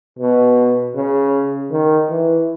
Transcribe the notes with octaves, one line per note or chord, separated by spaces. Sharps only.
B2
C#3
D#3
E3